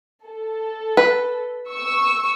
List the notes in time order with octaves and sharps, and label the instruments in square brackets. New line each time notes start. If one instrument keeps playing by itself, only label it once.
[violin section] A4
[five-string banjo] B4
[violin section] C#6 E6